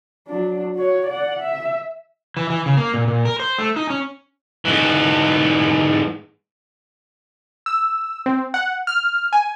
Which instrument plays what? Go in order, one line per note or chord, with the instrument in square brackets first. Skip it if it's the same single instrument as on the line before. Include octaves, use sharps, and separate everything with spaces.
[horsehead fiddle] F#3 D4
F#4 C#5
D5 F#5
E5
[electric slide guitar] E3
E3
C#3
A#3
A#2
A#2
A#4
C5
A3
D#4
C#4
[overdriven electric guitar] G#2 E3
[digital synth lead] E6
C4
F#5
F6
G#5